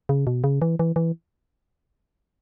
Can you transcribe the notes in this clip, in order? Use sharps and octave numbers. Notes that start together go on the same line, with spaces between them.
C#3
B2
C#3
E3
E3
E3